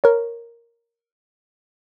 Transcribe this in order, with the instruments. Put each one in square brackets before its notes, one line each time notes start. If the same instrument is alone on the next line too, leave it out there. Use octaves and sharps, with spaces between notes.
[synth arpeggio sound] A#4 C#5